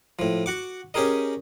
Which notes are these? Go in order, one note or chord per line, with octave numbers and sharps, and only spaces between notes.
A2 F3
F#4 F#5 D6
C#4 G4 G#4 A#4 D#5